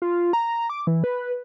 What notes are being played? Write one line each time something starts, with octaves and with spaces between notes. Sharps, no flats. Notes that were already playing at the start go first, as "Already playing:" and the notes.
F4
A#5
D6
E3
B4